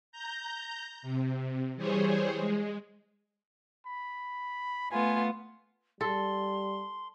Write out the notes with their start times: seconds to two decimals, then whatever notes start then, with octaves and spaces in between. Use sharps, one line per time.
0.12 A#5 G6
1.02 C3
1.76 E3 G3 G#4 C5 C#5
2.37 G#3
3.86 B5
4.91 A3 B3 F4 G#5
6.01 G3 A4 C6